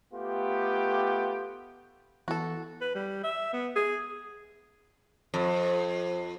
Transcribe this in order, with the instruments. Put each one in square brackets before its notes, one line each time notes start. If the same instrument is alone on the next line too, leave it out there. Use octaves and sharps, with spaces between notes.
[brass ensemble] A3 B3 F4 G4
[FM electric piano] E3 B3 E4 [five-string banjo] F#4 A4
[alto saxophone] B4
G3
E5
B3
G#4
[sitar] F2